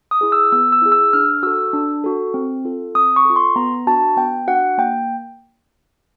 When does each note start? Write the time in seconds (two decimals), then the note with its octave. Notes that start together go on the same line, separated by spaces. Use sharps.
0.11 D#6
0.21 E4 G#4
0.32 E6
0.52 B3 E6
0.72 E6
0.82 E4 G#4
0.92 E6
1.13 D4 F6
1.43 F#4 A4 E6
1.73 D4
2.04 F#4 A4
2.34 C4
2.65 F4 A4
2.95 C4 D#6
3.16 C#6
3.25 F4 A4
3.36 C6
3.56 B3 A#5
3.87 D4 F#4 A5
4.17 B3 G5
4.47 D4 F#4 F#5
4.78 A#3 G5